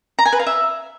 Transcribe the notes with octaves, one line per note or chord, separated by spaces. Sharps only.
A#5
G#5
B4
F5
E5